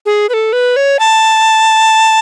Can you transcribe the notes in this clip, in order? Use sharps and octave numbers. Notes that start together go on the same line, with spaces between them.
G#4
B4
A4
B4
C#5
A5